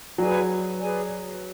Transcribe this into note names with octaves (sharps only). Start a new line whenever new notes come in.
F#3 G#4 B4 D5 G#5
G#4 B4 D5 G#5